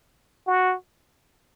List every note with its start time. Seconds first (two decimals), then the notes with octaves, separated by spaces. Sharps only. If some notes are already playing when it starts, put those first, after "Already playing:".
0.47 F#4